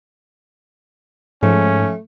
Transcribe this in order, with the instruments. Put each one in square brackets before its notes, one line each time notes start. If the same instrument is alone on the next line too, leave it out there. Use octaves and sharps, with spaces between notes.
[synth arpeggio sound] G#2 [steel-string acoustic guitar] F3 [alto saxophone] A3 [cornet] C#4